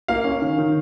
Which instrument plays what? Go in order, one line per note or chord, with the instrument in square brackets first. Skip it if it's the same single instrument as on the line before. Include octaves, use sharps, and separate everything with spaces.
[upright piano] A#3 [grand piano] F5
[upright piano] C#4
D#3
D#3